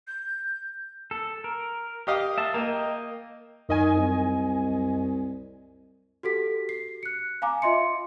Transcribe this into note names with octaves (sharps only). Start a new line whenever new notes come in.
G6
A4
A#4
G4 D#5 F5
E5 A5
A#3 D#5 G5 A#5
F#2 D#3 D#5 G#5
C2
F#4 G4 A4 B6
C7
F#6 C#7
F5 G#5 A#5 D6
F4 D#5 E5 C6 C#7